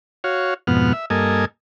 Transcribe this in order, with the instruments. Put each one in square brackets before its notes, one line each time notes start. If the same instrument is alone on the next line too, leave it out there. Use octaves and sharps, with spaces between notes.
[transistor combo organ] F#4 C#5 F5
F2 G#2 B2 B3 F#5 F6
E5
G2 A#3 A4 D#5 G#5